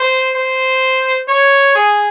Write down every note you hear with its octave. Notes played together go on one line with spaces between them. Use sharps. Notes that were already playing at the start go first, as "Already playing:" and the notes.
Already playing: C5
C5
C#5
G#4